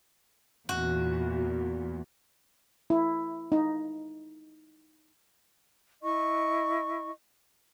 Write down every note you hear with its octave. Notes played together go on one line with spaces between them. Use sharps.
E2 A#2 F#4
E4
D#4
E4 D#5 C#6